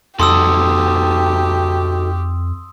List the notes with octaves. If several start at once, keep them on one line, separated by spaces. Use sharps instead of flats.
F2 D#4 F#4 G4 A4 C6 D#6 E6